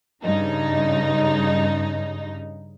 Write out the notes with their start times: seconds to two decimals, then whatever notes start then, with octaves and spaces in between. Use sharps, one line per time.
0.23 G2 C#3 D#4